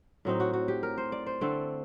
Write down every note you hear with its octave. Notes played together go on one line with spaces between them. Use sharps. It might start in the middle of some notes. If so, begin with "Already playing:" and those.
A2 F#3 C4 D#4
F#4
F#4
G4
A#4
C5
D5
C5
D3 A3 C4